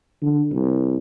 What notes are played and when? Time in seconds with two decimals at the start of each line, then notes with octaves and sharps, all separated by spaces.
0.22 D3
0.52 C2